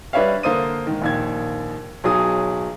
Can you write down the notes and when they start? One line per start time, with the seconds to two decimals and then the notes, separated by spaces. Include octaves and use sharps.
0.13 G3 D4 B4 C#5 E5 F5
0.43 D3 A#3 C5 D#6 D#7
0.87 G#2 D#3
1.02 A#1 D#2 G#6
2.04 B1 F#3 G#4 D#6